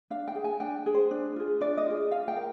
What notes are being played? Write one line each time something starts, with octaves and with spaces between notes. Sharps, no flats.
D4 F5
G5
G#4
G#5
D4 G5
G#4
C5
D4
F4 G#4
D4 D5
D#5
F4 G#4
F4 F5
G5
A#4